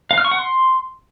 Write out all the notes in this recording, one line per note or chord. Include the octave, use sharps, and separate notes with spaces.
F5
F6
C#6
F#5
C6